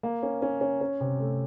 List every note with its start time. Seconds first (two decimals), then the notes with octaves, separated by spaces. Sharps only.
0.03 A#3
0.22 C#4
0.42 C#4
0.61 C#4
0.81 C#4
1.01 C3
1.20 A3